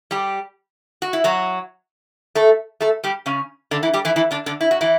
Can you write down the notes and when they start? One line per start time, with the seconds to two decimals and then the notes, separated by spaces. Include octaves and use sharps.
0.11 G3 G4
1.02 F#4
1.13 E4
1.24 F#3 F#4
2.35 A3 A4
2.81 A3 A4
3.04 G3 G4
3.26 C#3 C#4
3.71 D3 D4
3.83 E3 E4
3.93 G3 G4
4.05 E3 E4
4.16 E3 E4
4.31 D3 D4
4.46 D3 D4
4.61 E4
4.71 F#4
4.81 E3 E4